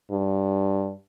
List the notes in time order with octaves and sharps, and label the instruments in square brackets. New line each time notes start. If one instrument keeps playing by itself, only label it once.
[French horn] G2